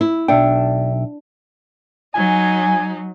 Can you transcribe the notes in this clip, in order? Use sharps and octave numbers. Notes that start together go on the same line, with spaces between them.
E4
B1 D4 E5 G5
F#3 D#4 G#5